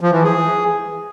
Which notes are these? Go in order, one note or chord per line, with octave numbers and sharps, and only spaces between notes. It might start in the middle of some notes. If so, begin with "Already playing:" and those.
F3
E3
G#4